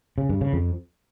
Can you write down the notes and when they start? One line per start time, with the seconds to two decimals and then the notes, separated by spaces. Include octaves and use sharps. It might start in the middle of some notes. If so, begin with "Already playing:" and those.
0.18 C#3
0.29 G2
0.41 C#3
0.53 F2